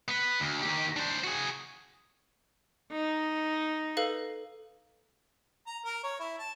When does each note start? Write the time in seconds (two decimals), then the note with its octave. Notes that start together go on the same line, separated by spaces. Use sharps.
0.08 B3 B4
0.40 D2
0.62 D#3 G4
0.97 D4 C5
1.24 F#4 G#4
2.92 D#4
3.97 A4 B4 F5
5.67 A#5
5.85 A#4
6.03 C#5
6.20 E4
6.38 A5